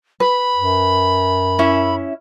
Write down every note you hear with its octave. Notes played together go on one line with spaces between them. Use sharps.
B4 B5
F#2
C#4 E4 E5